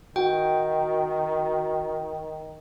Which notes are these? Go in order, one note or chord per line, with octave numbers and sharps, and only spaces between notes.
D#3 F#4 G5